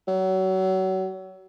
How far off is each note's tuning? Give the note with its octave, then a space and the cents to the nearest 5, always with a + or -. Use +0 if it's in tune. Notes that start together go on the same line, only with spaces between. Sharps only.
F#3 +30